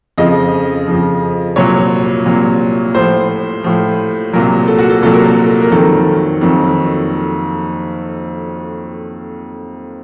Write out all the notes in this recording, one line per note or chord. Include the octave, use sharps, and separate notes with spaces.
F2 C#3 F3 D#5
F2 C#3 F3
C2 A#2 F#3 C#5
C2 A#2 F#3
A2 F3 C5
A2 F3
C2 A#2 F#3 A#4
A4
F#4
A4
C2 A#2 F#3 A4
A#4
A4
A#4
F2 D#3 F#3 A4
F2 D#3 F#3